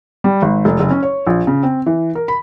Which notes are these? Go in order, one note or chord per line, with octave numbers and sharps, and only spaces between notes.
G3
G#1
F1
F#1
C#4
C#5
A#1
C#3
C4
E3
A#4
B5